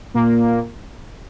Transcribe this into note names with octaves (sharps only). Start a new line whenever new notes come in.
A#2 A#3